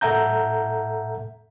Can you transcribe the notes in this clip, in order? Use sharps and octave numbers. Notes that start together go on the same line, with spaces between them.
A2 A4 E5 F#5 A#5 G6